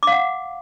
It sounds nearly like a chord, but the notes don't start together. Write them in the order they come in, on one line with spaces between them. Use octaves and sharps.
D6 F5 F#5